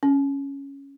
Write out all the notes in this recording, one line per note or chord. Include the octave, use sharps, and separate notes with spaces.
C#4